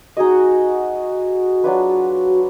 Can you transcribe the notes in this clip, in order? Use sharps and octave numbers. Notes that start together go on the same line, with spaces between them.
D#4 F#4 G#4 D#5
F#3 D4 F4 B4